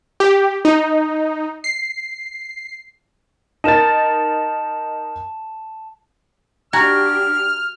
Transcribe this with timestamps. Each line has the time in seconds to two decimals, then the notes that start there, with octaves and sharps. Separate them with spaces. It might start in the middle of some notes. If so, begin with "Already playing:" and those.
0.20 G4
0.65 D#4
1.64 C7
3.64 D#4 A#4 A5 A6 E7
6.73 D4 F#4 G4 G#5 A#5 F6 G#6